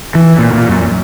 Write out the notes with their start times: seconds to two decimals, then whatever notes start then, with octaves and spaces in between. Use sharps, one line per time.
0.15 E3
0.38 A#2
0.53 A#2
0.69 F#2